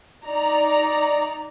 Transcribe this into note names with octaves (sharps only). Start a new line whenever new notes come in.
D#4 D5 A#5